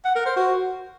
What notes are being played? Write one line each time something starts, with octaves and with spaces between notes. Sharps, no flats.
F#5
A#4
C5
F#4